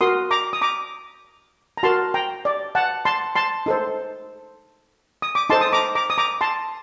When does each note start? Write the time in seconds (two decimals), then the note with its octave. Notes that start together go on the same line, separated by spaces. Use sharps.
0.01 F#4 A#4 C6 D#6
0.31 A#5 D6
0.53 D#6
0.61 A#5 D6
1.77 A#5
1.83 F#4 A#4 A5 C6
2.14 G5 A#5
2.45 D5
2.75 F#5 A5
3.05 A5 C6
3.35 A5 C6
3.66 D#4 A4 C5
5.22 D#6
5.35 D6
5.50 D#4 A4 C5 A5 C6
5.61 D#6
5.73 A#5 D6
5.95 A#5 D6
6.10 D#6
6.18 A#5 D6
6.41 A5 C6